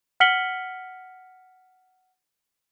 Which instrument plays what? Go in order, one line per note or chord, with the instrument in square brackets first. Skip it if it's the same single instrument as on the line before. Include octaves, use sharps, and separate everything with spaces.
[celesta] F#5 F6 B6 C#7 F#7 G7